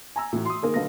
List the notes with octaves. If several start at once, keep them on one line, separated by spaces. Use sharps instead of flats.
G#5 A#5 E6
A2 E3 F#4
C6 D#6
D#3 A#3 G#4 A#4
B1 D3 A3 B4 F5 A#6